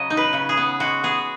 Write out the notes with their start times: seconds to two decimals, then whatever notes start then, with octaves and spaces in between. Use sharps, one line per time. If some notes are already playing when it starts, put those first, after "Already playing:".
Already playing: C#3 F#3 D#5
0.10 D#4
0.17 B4
0.33 C#3
0.49 G#4
0.57 B3
0.80 G#3 F#4
1.03 B3 G#4